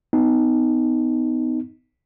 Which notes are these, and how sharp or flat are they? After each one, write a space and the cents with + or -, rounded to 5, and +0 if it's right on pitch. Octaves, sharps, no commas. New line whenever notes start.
B3 +30 D#4 +0